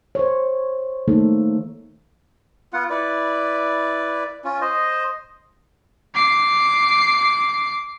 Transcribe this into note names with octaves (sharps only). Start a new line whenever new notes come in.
C5 C#5
D#3 G3 A3 A#3 D#4 A4
B3 F4 F#5
E4 B4 D5
C#4 F4
C5 D#5
D6 C7